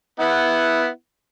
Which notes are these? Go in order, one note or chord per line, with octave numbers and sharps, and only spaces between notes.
B3 E4 F#5